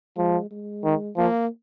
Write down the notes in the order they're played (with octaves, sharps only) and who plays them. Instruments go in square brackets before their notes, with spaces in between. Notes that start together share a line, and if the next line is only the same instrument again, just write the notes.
[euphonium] F3 [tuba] G#3
[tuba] G#3
[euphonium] D#3
[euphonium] F3 [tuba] A#3